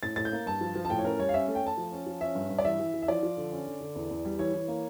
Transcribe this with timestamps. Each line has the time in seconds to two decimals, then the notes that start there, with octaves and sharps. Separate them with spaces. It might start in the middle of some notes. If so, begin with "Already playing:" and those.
0.03 A2 A6
0.16 A2 A6
0.25 G6
0.32 A#3
0.46 G2 A5
0.61 F3
0.76 F3
0.85 A5
0.90 A2 G5
0.99 C#5
1.05 C#4 A#4
1.19 G3 C#5
1.29 F5
1.34 C#4 E5
1.48 A3
1.55 G5
1.63 A3 A5
1.77 F3
1.92 C#4
2.07 F3
2.21 C#4 E5
2.35 G2
2.50 G2
2.58 D5
2.65 E3 E5
2.80 E3
2.94 E3
3.02 E5
3.08 F3 D5
3.23 F3
3.37 D3
3.52 C#4
3.66 D3
3.81 D3
3.95 E2
4.10 E2
4.25 G3
4.39 E3 C#5
4.54 E3
4.68 A#3